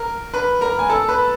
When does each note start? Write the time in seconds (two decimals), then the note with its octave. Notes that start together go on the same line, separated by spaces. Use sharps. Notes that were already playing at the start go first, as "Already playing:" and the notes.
Already playing: A#4
0.34 B4 B5
0.61 A#4 A#5
0.79 G#5
0.89 A4 A5
1.09 B4 B5